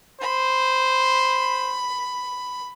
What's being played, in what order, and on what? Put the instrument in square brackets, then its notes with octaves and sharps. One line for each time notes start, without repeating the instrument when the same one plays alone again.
[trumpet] C5 [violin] B5